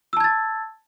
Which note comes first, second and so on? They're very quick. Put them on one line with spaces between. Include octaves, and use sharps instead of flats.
E6 A5 G#6 A6